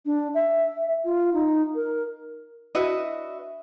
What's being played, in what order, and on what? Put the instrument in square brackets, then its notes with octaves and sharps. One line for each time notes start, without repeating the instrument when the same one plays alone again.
[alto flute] D4
E5
F4
D#4
A#4
[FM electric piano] D4 E4 E5 [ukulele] F#4 B4 D#5